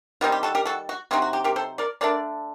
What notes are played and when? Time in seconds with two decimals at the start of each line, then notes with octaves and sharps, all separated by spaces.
0.21 D#3 G3 C4 D#4 F#4
0.32 G4
0.43 F#4 A4
0.55 G4 A#4
0.65 F#4 A4
0.89 F#4
1.11 C3 F#3 C4 D#4 F#4
1.22 F#4
1.33 G4
1.44 G4 A#4
1.56 A4 C5
1.78 A#4 D5
2.01 D3 A3 D4 A#4 D5